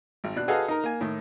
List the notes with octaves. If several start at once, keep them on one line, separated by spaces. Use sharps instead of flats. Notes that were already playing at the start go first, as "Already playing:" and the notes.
G#1
B2 D4 F#6
F#4 G#4 A4 B4 D#5 F5
D#4 A#4
A#3 G#5
A2 D#3